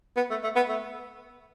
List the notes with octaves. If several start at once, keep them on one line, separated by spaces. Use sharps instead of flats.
B3
A3
A3
B3
A3